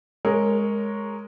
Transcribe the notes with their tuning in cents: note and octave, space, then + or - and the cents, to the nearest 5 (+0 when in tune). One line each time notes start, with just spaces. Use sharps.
G#3 +0 A#4 +0 C#5 +0